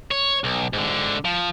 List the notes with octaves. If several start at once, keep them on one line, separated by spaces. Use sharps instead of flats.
C#5
B1
G#2 D3
F3